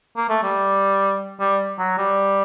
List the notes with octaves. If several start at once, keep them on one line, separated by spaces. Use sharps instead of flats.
A#3
A3
G3
G3
F#3
G3